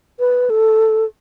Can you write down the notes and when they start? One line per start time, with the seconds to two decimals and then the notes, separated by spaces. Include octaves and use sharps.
0.20 B4
0.50 A4